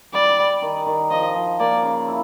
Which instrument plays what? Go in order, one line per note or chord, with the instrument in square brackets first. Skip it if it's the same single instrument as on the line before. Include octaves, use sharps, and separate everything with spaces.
[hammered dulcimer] G3 [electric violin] D5
[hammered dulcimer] G3
D#3
D#3
[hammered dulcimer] F3 [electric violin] D#5
[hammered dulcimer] F3
[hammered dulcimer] A#3 [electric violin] D5
[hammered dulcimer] C#3
E4